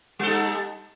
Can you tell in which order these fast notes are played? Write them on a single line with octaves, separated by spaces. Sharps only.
G3 A4 D#4